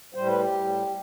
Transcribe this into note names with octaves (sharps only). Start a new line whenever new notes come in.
A2 G3 C5
B4
G4
A2 G3